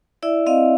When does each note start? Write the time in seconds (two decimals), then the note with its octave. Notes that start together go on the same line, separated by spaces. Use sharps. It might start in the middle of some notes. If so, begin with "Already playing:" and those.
0.22 E4 D5 E5
0.46 C4 D#5 F5